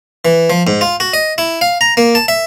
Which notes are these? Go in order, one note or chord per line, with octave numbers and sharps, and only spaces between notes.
E3
F3
G#2
F4
F#4
D#5
E4
F5
A#5
A#3
A5
E5